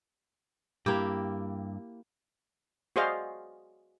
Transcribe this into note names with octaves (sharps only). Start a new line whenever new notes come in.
G2 A#3 E4 G4
F#4 G#4 C5 D5 D#5 F5